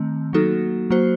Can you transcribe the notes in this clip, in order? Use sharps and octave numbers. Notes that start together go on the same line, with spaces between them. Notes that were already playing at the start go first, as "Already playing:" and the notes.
Already playing: D#3 A3 C4
F#3 A#3 D#4 F#4 A4
F#3 A#3 F#4 C5